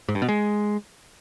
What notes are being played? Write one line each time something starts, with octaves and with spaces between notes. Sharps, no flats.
G#2
G2
B2
G#3